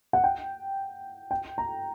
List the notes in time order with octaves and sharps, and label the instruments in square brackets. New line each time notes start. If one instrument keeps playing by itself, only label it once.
[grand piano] F#5
G5
G5
A#5